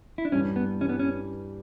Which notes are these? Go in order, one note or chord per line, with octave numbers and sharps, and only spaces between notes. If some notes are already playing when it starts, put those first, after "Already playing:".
E4
D4
G2 E3 G3 C#4
B3
G2 E3 G3 C#4
B3
C#4